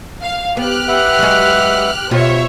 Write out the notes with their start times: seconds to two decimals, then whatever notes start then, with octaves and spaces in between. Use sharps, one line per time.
0.22 F5
0.57 B3 G4 F6 F#6
0.88 B4 E5 F#5
1.19 F#3 G#3
2.11 B2 F4 G4 C5 C#5 E5